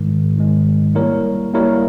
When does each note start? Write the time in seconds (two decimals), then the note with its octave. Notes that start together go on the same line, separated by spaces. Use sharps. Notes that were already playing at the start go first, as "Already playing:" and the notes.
Already playing: G#2 D#3 G#3
0.37 G#2 D#3 G#3
0.95 G3 A#3 E4 A#4 C#5
1.54 G3 A#3 E4 A#4 C#5